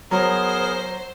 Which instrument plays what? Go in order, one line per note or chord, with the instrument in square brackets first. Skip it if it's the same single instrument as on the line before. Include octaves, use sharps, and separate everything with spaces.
[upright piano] F#3 [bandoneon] B3 G#4 A#4 [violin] C5